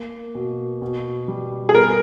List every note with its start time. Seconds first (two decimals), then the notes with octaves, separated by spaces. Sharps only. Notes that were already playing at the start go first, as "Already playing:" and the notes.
Already playing: A#3
0.35 B2
0.82 B2
1.28 G3
1.69 G#4
1.75 B3 A#4